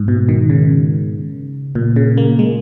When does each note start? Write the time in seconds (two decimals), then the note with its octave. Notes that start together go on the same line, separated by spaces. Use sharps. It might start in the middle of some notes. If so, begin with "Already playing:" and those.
Already playing: G#2
0.08 B2
0.29 D#3
0.50 C#3
1.75 A#2
1.96 C#3
2.17 A#3
2.39 G#3